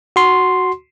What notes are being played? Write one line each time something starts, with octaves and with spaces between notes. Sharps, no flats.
F#4 C6